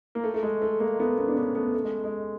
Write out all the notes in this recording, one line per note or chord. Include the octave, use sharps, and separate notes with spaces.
A#3
A3
A3
G#3
A3
G#3 A#3
A3 B3
B3 C#4
D4
B3 C#4
A3 B3
A3
G#3
G#3